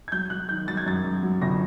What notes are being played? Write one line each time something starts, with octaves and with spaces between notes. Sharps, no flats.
G#6
F#3 G6
F#3 F#6
D#3 G6
F#3 A6
G#6
F#2 A6
F#2
F#3
G1 A#6